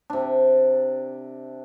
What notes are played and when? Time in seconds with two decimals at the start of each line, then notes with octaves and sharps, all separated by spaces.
0.10 C3 D4